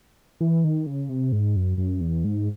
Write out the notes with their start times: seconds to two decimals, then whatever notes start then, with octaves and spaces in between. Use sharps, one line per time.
0.41 E3
0.64 D#3
0.87 C#3
1.09 C3
1.32 G#2
1.56 F#2
1.78 F#2
2.01 E2
2.24 G#2